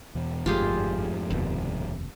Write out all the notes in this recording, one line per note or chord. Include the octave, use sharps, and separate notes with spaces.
E2 B2
G1 F2 G#2 A3 F4 G4 G#4
F1 D#2 B2